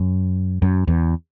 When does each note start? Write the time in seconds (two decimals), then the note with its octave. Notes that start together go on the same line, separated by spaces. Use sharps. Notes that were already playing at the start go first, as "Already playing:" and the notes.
Already playing: F#2
0.62 F#2
0.88 E2